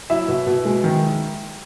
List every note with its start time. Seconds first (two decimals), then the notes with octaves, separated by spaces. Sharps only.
0.09 F#3 E4 E5
0.28 B2
0.47 B2
0.65 G#3
0.84 D#3